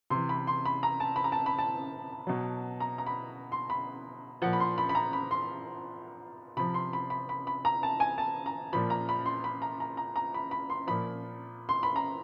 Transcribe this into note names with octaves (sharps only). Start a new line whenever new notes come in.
C3 E3 C6
B5
C6
B5
A#5
A5
B5
A#5
A5
B5
A5
B2 F#3
A#5
A#5
B5
C6
B5
A#2 F3 F#5
B5
C6
B5
B5
A#5
B5
C6
C3 F3 B5
C6
B5
B5
B5
B5
A#5
A5
G#5
A5
A#5
A#2 F3 B5
A#5
B5
C6
B5
A#5
A#5
A#5
A#5
B5
B5
C6
A#2 F3 B5
C6
B5
A#5